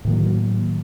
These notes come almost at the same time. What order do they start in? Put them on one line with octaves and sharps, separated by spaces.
A2 D#3 A#3 F#3